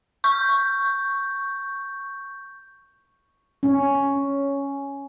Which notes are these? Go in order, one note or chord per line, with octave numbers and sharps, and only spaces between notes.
C#6 G6
C#4